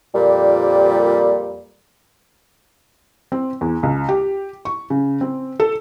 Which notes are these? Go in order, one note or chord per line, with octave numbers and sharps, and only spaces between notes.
F2 A#2 G3
C4
E2
C#2
G4
C#6
C#3
C4
A4